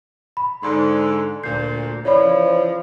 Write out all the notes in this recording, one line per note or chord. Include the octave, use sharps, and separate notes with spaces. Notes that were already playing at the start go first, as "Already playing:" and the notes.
B5
G#2 D3 C6
D2 A#2 G6 C7
C#3 E3 F3 C#5 D5 B5